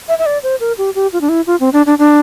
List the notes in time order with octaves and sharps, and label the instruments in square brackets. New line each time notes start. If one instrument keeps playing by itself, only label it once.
[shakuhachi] E5
E5
D5
C5
A#4
G4
G4
F4
D4
E4
F4
C4
D4
D4
D4